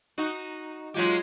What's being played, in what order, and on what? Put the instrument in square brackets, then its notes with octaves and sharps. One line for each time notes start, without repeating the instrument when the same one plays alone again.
[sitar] D#4 F#4
[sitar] F#3 G#3 G4 [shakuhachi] F4